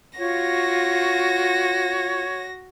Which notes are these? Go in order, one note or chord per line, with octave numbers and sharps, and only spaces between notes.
F4 F#4 C#5 A#6